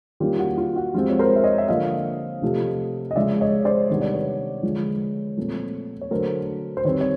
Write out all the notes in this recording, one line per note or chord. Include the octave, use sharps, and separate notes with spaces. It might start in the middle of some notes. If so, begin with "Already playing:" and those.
D#3 G3 A#3 C#4 F4 G4
F#4
F4
F#4
F3 G#3 C4 F4 G4
C#5
A#4 C5
E5
C#5 D#5
E5
D3 F3 A#3 D4 D#5 F5
C3 F3 A3
D#5
C#3 F3 G#3 D5 E5
C#5 D#5
C5 D5
C3 D#3 G3 B3 D4 C#5
D5
B4 C#5
D3 F3 G#3
A#2 F3 A3 C4
C#5
D3 F#3 A3 D4 A#4 C5
C5
D#3 G3 C4 B4 C#5
C#5